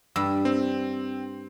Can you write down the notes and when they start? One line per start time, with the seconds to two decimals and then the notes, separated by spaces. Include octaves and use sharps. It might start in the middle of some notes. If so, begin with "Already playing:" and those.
0.16 G2 G3 E6
0.45 C4